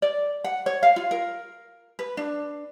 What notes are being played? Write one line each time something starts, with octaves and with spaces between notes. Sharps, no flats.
D5
F#5
C#5
F5
F4
A#4
B4
D4